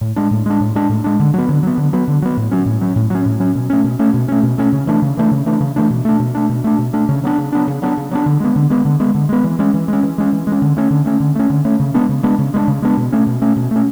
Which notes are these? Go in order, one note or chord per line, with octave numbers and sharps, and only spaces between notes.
A2
G#3 D4
A2
G#3 D4
A2
G#3 D4
A2
G#3 D4
D3
F#3 B3
D3
F#3 B3
D3
F#3 B3
D3
F#3 B3
A2
F#3 C#4
A2
F#3 C#4
A2
F#3 C#4
A2
F#3 C#4
B2
A3 C#4
B2
A3 C#4
B2
A3 C#4
B2
A3 C#4
C#3
E3 A3 D4
C#3
E3 A3 D4
C#3
E3 A3 D4
C#3
E3 A3 D4
B2
A3 D4
B2
A3 D4
B2
A3 D4
B2
A3 D4
C#3
F#3 B3 D4
C#3
F#3 B3 D4
C#3
F#3 B3 D4
C#3
F#3 B3 D4
D3
G#3 B3
D3
G#3 B3
D3
G#3 B3
D3
G#3 B3
E3
G#3 C#4
E3
G#3 C#4
E3
G#3 C#4
E3
G#3
C#4
D3
A3 C#4
D3
A3 C#4
D3
A3 C#4
D3
A3 C#4
C#3
G#3 B3 D4
C#3
G#3 B3 D4
C#3
G#3 B3 D4
C#3
G#3 B3 D4
B2
A3 C#4
B2
A3 C#4
B2
A3 C#4